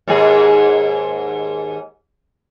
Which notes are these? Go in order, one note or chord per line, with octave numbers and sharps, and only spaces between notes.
D#2 G#2 G#4